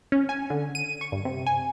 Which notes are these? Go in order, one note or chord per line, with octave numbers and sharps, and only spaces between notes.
C#4
G#5
D3
D#7
C#6
G2
C3
G#5